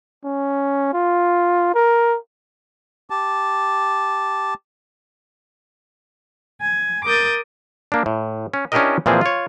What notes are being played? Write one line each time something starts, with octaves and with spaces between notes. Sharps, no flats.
C#4
F4
A#4
G4 A5
G#5
A#4 D6 D#6 G6 A6
A#3 D4
A2
C#4
C#4 D4 E4 G4 A#4 D#5
A#2 E3 F3 C4 G#4
F4 C#5